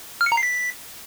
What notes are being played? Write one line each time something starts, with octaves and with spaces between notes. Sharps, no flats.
F6
C#7
A#5
C7
B6